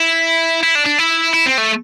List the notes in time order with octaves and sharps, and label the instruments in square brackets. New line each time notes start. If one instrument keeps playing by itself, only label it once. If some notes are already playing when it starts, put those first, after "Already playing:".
Already playing: [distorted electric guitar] E4
E4
D4
D4
E4
E4
C4
A3